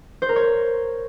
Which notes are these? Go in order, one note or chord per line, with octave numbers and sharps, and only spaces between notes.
C5
A#4
C#5